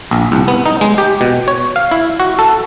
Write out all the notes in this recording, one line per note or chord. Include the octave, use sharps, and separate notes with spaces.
A#1
C2
B3
D#4
G#3
G4
B2
C#5
F5
E4
F#4
A4